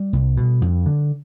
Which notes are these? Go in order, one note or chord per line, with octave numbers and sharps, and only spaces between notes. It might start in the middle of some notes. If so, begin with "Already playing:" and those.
Already playing: G3
C2
B2
F2
D3